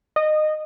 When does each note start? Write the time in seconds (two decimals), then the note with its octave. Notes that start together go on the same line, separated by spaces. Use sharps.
0.16 D#5